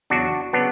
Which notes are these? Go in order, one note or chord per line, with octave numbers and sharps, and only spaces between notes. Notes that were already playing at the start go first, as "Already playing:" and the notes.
E2 C#3 F#3 D4 F#4
C#3 F#3 B3 D4